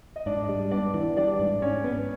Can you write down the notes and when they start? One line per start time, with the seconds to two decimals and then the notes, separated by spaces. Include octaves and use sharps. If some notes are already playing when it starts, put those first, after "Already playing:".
0.16 D#5
0.26 G#2 D4 D5
0.49 G3
0.71 B3 D4 D5
0.94 E3
1.17 G3 D4 D5
1.39 G#2
1.62 G#2 C#4 C#5
1.84 B3